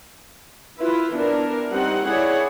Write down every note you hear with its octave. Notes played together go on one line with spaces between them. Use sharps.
E4 F4 B4
E3 B3 D4 A#4
G3 C4 D#4 F#5
E4 G#4 C#5 D5 F#5